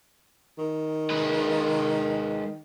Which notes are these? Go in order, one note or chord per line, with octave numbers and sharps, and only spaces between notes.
D#3
G#3 B4